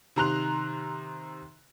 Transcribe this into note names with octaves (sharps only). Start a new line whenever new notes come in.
C3 D#3 A#5 C6 F#6 F7